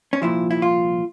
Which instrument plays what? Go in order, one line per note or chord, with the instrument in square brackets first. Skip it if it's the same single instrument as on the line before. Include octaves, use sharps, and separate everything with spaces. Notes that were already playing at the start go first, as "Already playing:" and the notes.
[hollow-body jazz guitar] C#4
C2 A#2 F3 E4
E4
F4